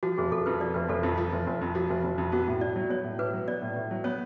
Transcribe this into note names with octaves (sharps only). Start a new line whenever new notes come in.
F3 F#4
F1 G#4
F1 A4
F2 B4
F3 D5
F1 B4
F1 A4
F2 F4
F3 F4
F1
F1
F2
F3 F#4
F1
F1
F2
B3 F#4
A2
A2 D5
F#3
B3 C#5
A2
A2 B4
F#3
B3 D5
A2
A2
F#3
B3 C#5